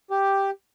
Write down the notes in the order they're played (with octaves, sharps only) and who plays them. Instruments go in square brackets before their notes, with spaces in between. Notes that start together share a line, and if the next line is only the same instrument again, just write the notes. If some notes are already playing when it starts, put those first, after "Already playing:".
[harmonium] G4